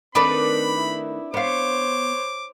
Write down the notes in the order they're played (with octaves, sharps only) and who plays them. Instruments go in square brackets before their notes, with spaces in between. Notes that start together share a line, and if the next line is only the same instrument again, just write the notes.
[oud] D#3 A3 [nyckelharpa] C4 [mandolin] D4 B4 D5 [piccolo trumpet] B5
[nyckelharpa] E4
[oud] B3 F5 [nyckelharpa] C5 C#5 [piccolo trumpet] D6